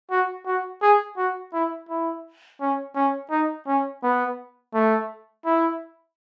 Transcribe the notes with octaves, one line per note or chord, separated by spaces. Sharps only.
F#4
F#4
G#4
F#4
E4
E4
C#4
C#4
D#4
C#4
B3
A3
E4